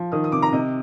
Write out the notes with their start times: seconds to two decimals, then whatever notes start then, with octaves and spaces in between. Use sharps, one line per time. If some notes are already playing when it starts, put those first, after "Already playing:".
Already playing: F3
0.12 D#3 D#6
0.24 D#6
0.32 C3 D6
0.42 A#5
0.52 C3 D#5